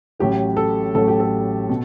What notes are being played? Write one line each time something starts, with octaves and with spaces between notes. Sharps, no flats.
A1 A2 F#3 A3 G4
A4
A1 A2 F#3 A3 A4
G4
A4
B2